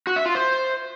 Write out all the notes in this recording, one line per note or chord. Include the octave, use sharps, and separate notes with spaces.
F#4
E5
F4
C5